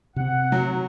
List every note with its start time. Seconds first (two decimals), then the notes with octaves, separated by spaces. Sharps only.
0.16 C3 C4 F#5
0.52 F#3